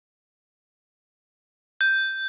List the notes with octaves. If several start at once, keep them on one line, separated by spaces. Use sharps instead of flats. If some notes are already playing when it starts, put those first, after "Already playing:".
G6